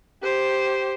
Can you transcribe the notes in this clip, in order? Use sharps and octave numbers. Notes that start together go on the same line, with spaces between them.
G4 C5